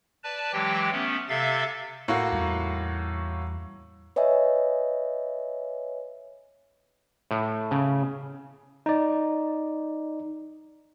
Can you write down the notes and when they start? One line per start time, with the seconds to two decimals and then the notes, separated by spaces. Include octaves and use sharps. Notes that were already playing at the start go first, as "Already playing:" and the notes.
0.24 B4 D5 A5
0.53 E3 F#3 G#3 G4 G5
0.92 A3 B3 C#4
1.29 C3 A4 E5 F5 A6
2.08 A2 A#3 F#4
2.32 E2 G3
4.16 B4 C#5 D#5 E5 G#5
7.31 A2
7.71 C#3
8.86 D#4 D5